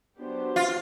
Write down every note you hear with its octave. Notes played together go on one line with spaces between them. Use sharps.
F#3 B3 D4 G4 C5
F4